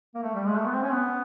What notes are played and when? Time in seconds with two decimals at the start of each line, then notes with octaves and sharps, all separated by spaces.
0.15 A#3
0.22 A3
0.35 G3
0.46 G#3
0.57 A3
0.66 B3
0.74 C4
0.83 C#4
0.92 B3